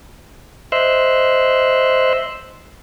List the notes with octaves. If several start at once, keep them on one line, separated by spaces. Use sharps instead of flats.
C5 D#5 E5 C6 E6 F#6